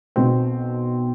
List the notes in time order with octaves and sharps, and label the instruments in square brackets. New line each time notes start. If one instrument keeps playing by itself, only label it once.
[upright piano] B1 B2 C4